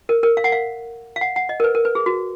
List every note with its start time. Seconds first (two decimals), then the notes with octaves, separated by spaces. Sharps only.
0.09 A#4
0.23 A#4
0.37 F5
0.44 F#5
0.52 F5
1.16 F5
1.21 F#5
1.36 F#5
1.49 D#5
1.60 A#4
1.64 B4
1.75 A#4
1.85 B4
1.95 G#4
2.06 F#4